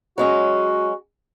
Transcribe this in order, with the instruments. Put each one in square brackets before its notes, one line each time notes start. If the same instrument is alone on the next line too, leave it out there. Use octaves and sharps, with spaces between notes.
[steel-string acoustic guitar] F#3 G#3 C#4 [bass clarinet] F#4